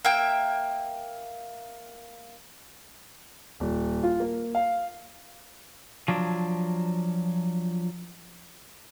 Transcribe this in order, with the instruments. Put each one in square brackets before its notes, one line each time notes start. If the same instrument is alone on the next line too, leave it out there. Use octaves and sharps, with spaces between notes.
[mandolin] A#3 E5 G5
[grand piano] D#1
F4
A#3
F5
[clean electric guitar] F3 F#3 D4